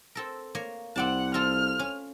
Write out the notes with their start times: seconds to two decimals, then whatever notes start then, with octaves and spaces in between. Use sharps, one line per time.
0.15 C4 A4 A#4
0.55 A#3 A#4 C#5
0.96 C2 C4 D5 F#5 A5
1.34 C4 F4 A4 F6
1.79 C#4